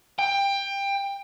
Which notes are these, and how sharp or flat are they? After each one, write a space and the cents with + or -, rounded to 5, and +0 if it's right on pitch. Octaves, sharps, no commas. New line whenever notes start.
G5 +20